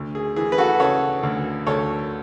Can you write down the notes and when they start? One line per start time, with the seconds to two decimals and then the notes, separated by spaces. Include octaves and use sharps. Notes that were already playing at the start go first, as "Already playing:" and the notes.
Already playing: D2
0.15 G#4
0.36 E3 G#4
0.52 B4
0.58 F#4 A4
0.80 C#3 A4 C#5
1.23 D2
1.66 D2 A4 C#5